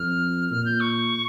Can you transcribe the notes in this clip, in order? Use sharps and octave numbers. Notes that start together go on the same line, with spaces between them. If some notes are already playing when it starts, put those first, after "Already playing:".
Already playing: F2 F6
A#2 F6
G6
C#6